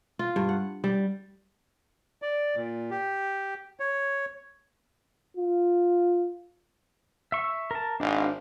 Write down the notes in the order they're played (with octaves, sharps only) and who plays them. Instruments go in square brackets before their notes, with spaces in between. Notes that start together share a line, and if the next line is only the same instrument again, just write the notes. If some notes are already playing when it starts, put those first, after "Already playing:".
[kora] F4
G2
F#5
G3
[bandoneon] D5
A#2
G4
C#5
[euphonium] F4
[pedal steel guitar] E5 C#6
A#4 A5
[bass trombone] G#1 [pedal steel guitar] D4 F5